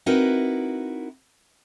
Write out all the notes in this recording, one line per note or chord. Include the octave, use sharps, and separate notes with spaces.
C4 D#4 E4 F#4 A#4 B4